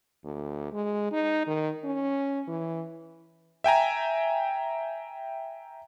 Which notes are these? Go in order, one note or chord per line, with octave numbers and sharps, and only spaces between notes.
D2
G#3
D#4
D#3
C#4
E3
E5 G5 G#5 A#5